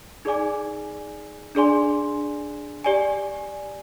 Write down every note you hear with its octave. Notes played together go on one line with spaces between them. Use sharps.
D#4 G#4 D5 G#5 D6
D4 G#4 D5 G#5 C6
G4 D5 G#5